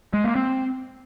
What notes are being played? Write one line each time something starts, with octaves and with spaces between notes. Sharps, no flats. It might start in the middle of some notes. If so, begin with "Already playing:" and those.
G#3
A#3
C4